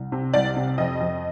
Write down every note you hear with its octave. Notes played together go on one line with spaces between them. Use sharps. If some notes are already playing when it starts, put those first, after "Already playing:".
Already playing: C2
C3
C2 D5
C3
F2 D#5
F2